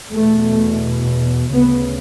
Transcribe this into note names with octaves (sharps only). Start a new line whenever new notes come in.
E2 B2 A3
D2 C#3 B3